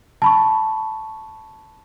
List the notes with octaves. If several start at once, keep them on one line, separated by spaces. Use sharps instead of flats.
A5 B5 C#6